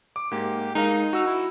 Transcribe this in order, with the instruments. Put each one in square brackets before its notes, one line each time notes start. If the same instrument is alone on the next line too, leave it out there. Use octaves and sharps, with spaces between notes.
[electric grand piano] D6
[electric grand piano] G#2 A#3 [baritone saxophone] G4
[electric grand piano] G#3 A#4 F5 [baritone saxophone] D#4
[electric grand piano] F#4 E6
[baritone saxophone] E4